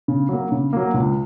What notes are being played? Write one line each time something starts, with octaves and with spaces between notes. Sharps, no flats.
C#3
F#3 A#3
C#3
F#3 A#3
C#2